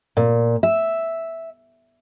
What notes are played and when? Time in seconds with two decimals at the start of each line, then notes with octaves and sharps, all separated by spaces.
0.17 A#2
0.63 E5